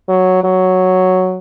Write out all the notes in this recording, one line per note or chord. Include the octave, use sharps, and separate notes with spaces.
F#3
F#3